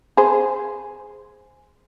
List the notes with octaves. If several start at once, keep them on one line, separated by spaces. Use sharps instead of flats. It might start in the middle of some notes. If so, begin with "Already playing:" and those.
G#4 C5